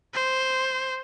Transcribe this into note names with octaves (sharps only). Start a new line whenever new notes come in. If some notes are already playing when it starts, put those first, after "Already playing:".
C5